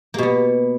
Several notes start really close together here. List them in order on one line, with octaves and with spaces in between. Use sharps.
A#3 B2 B3